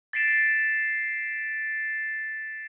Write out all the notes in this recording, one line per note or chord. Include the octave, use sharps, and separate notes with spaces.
A6 B6 C7 D7 E7